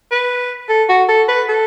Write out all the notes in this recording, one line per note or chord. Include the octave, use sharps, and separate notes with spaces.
B4
A4
F#4
A4
B4
A4